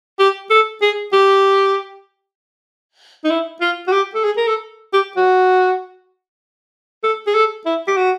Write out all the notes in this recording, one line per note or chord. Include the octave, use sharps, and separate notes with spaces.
G4
A4
G#4
G4
D#4
E4
F4
F#4
G4
A4
G#4
A#4
A4
G4
F#4
A4
G#4
A4
E4
G4
F#4